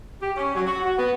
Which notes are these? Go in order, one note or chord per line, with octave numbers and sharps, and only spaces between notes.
G4
C#4
F#3
F#4
F#4
B3